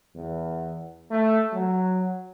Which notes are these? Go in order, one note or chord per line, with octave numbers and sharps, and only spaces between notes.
E2
A3
F#3